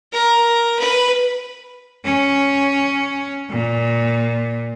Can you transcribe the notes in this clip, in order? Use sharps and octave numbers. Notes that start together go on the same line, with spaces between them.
A#4
B4
C#4
A#2